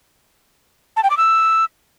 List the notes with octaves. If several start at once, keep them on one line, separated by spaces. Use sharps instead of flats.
A5
G5
D6
E6